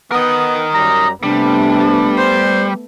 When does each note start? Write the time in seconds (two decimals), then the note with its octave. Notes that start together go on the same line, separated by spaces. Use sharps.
0.11 B3 A#4 D#5
0.74 F#2 G3 A#5
1.23 C3 G3 A3 B3 D4
2.17 C5